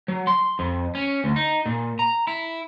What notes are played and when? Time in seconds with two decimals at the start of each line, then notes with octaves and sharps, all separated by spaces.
0.08 F#3
0.27 C6
0.59 F2
0.95 C#4
1.24 D2
1.36 D#4
1.66 A#2
1.99 A#5
2.27 E4